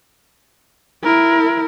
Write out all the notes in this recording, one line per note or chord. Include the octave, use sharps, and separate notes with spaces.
E4 A#4